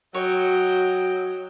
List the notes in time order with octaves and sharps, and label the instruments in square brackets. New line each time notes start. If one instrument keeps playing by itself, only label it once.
[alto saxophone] F#3 [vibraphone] F#4 [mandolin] C#5 [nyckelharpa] D#5 G5